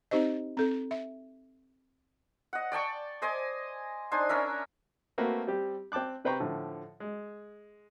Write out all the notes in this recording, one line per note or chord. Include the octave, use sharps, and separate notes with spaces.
C4 D#4 G4 C5 D#5
C4 A4
E5
D#5 F#5
D5 G5 A5 C#6
C5 D#5 G#5 D6
D4 D#4 C5 G#5
C#4 D4 A#4 E5
A3 A#3 C4 F#4 A#4 B4
G3 C4 G4
C4 G5 A5 D6 F#6
C3 B4 C5 G5 A#5 C#6
A2 D3 F3
G#3